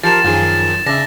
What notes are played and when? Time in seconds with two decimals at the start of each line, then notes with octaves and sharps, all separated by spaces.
0.03 F3 G4 A#4 A6 E7
0.24 F#2 D#3 F3 F4 G#4
0.86 C#3 D4 E5 A#6